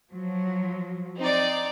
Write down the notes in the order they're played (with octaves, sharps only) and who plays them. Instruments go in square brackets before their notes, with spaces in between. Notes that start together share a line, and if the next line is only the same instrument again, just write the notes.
[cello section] F3 F#3
[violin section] C4 D#4 D5